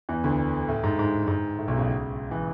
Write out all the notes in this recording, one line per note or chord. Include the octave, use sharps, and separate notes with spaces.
E2 E3
D2 D3
A2
G#2
G#2
G#2
A2
B1 B2
C#2 C#3
E3